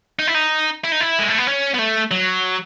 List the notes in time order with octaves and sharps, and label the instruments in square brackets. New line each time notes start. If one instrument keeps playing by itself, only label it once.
[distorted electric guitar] D#4
E4
D#4
E4
D#4
E4
G#3
A3
B3
C#4
B3
A3
F#3